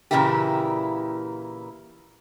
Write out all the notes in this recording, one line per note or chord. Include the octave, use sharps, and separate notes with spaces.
A#2 C#3 E3 A#3 E4 G4